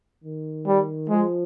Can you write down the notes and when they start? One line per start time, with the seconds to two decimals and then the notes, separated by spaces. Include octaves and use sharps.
0.24 D#3
0.67 G3
1.09 F3 G#3